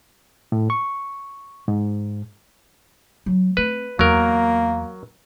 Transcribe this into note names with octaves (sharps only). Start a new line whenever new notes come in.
A2
C#6
G#2
F#3
A3 C4 B4
E2 F#3 A#3 A#4